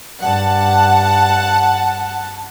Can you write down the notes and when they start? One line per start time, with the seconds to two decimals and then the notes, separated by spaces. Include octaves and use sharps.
0.21 G2 F#5 A5